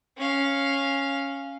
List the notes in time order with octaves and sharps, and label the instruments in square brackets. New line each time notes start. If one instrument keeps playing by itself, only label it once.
[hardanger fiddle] C#4 F5